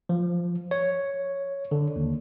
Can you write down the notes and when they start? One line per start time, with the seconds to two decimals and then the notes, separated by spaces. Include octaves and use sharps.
0.09 F3
0.71 C#5
1.71 D3
1.96 D#2